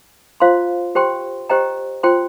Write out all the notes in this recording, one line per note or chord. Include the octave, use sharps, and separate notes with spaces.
F4 C5 F5 C6
G4 C5 G5 C6
G4 C5 D#5 G5 A#5
F4 C5 G5 C6